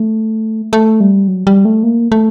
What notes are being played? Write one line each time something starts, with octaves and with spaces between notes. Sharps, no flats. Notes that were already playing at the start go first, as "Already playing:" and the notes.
Already playing: A3
A3
G3
F#3
G3
A3
A#3
A3